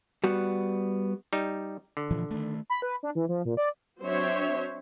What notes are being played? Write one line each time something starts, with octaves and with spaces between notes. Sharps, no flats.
G3 B3 F#4
G3 D#4
D3
A#2 E3 F3
D#3 A3
B5
B4
D4
E3
F3
A#2
D5
F#3 C4 D4 C5 C#5 E5